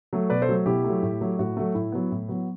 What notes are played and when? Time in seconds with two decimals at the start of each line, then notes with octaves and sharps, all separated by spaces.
0.13 F#3 A3
0.30 B2 B4 D5
0.42 A4 C5
0.49 F#3 A3
0.66 B2 E4 G4
0.85 F#3 A3
1.03 A2
1.21 F#3 A3
1.39 A2 F#4
1.57 F#3 A3
1.74 A2 E4
1.92 F#3 B3
2.12 A2
2.28 F#3 B3